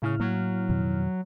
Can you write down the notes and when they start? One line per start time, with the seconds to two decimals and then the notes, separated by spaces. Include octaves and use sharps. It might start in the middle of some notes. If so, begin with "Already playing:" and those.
0.02 A2 C#3 E4 F6
0.20 F#3 A#3
0.69 F2 B2 D#3